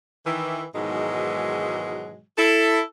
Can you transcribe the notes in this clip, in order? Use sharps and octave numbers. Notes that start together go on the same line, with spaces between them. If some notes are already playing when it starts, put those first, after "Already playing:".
D#3 E3
G#2 B2 D#3 E3 F#3 G#3
E4 A4